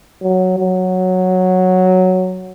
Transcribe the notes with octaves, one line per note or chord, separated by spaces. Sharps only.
F#3
F#3